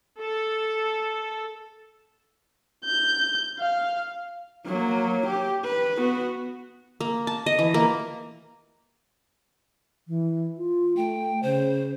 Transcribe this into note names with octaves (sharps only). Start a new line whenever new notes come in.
A4
G6
F5
F#3 A#3
G4
B4
B3 F#4
A#3
A5
D#5
E3
A#3
E3
F4
A3 G5
C#3 C5